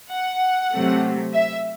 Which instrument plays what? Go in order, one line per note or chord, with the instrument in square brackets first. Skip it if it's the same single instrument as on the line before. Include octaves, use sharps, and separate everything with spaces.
[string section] F#5
C3 F#3 A3
E5